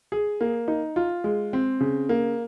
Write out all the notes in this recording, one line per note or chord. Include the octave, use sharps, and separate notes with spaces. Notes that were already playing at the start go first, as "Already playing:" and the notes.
G#4
A#3
D#4
F4
G#3
C4
C#3
A#3